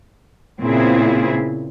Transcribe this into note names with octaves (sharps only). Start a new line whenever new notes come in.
A#2 C#3 B3 C4 E4 G#4